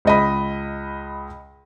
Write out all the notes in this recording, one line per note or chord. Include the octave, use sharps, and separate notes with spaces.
C#2 D#5 B5